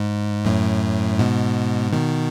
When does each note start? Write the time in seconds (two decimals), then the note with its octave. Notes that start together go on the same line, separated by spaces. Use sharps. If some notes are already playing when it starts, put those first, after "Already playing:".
Already playing: G#2
0.45 F#2 A2
1.19 G#2 B2
1.92 B2 D#3